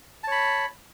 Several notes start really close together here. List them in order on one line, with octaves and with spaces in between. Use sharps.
A5 C#5 B5